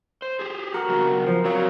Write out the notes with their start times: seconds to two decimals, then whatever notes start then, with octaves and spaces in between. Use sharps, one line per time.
0.22 C5
0.39 G4 G#4
0.74 F#4 A#4
0.89 C#3 F#3 B3
1.26 F3
1.45 F#3 C4 C#5 F5